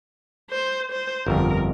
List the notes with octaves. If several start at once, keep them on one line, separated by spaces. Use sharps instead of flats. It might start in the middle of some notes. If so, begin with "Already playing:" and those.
C5
C5
G1 F2 A#4